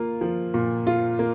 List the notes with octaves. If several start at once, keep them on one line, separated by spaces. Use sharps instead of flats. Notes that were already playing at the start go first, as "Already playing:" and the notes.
Already playing: A#3 F4
F3
A#2
F4
A#3